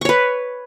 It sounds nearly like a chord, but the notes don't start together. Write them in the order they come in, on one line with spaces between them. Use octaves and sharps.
C#6 C#5 B4